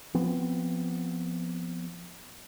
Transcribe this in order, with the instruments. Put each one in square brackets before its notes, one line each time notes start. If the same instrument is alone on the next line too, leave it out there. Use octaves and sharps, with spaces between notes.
[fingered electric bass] F3 B3 C4